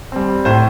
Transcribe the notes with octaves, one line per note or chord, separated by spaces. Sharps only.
G3 C4
A2 C5